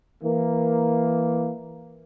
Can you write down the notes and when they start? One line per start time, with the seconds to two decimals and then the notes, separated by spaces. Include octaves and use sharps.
0.24 E3 A#3